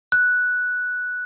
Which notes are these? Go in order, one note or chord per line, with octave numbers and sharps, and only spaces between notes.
F#6